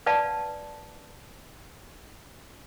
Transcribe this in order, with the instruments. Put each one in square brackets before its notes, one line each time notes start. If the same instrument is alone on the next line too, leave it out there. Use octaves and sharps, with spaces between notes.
[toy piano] B4 D5 F5 F#5 A5